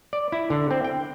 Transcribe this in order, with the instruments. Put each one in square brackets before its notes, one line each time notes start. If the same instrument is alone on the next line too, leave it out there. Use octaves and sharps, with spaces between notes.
[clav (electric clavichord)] D5
E4
D3
C4
G5